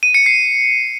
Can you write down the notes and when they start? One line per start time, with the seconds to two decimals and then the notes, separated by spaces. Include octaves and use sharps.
0.03 D#7
0.14 C#7
0.26 C7